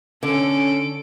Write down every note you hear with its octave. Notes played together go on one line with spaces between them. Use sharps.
D3 C#4 A4 D7